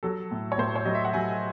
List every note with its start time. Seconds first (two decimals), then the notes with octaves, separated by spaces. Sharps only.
0.03 F#3 A4
0.31 A2
0.52 C#5
0.58 A2 C5
0.76 C#5
0.85 F#3 D#5
0.94 E5
1.05 F#5
1.14 F#3 G#5